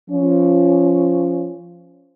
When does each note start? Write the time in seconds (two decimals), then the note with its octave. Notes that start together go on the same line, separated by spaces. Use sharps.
0.11 F3 C#4